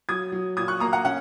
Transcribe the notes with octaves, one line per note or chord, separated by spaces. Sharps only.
F#3 D#6 G#6
F#3
A#2 D#6 G#6
C#6 F#6
A#3 A#5 D#6
F#5 A#5
C#4 F#5